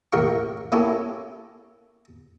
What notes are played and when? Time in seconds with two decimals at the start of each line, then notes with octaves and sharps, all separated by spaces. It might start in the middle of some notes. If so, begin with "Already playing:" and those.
0.13 A1 D#2 A#3 A#4 G5 C#6
0.72 A#3 C#4 E4 G4 A4 C#5